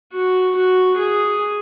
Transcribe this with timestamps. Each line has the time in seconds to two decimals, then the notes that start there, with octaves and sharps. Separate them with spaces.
0.13 F#4
0.55 F#4
0.97 G#4